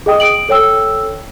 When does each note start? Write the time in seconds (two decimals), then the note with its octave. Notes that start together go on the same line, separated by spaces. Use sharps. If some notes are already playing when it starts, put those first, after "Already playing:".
0.06 G#4 D#5 G5 D#6
0.20 D#6 D7 F#7
0.49 A4 C#5 G5 E6